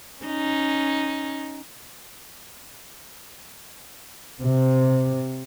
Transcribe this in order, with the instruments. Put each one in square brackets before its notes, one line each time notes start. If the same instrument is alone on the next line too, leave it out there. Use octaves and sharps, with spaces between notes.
[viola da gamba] C#4 D#4
[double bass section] C3